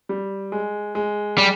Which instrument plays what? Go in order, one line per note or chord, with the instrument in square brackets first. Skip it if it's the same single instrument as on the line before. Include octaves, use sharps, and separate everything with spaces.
[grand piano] G3
G#3
G#3
[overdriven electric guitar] G3